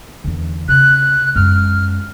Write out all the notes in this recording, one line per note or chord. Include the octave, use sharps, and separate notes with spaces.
E2 D3
C#3 F#6
F#2 G#3 F6